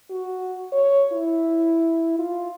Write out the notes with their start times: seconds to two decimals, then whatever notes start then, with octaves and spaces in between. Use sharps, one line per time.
0.10 F#4
0.72 C#5
1.13 E4
2.19 F4